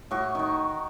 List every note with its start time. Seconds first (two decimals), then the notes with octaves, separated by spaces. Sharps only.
0.11 A2 F#4 C#6
0.35 D#3 D#4